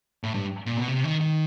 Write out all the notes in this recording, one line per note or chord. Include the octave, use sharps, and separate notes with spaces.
A2
G2
A#2
B2
C3
D#3
D#3